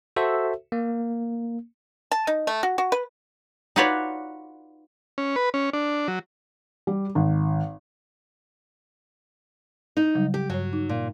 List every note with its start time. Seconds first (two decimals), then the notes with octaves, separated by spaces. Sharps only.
0.16 F#4 A4 C5 E5
0.72 A#3
2.11 A5
2.27 D#4
2.47 A3
2.63 F#4
2.78 F#4
2.92 B4
3.76 D#4 F4 F#4 B4 C#5 D5
5.18 C#4
5.36 B4
5.54 C#4
5.73 D4
6.08 F#3
6.87 G3
7.15 G#1
9.97 D#4
10.15 C#3 F#3 G3
10.34 G4
10.50 G2 F#3 C#5
10.73 D#4
10.89 A#2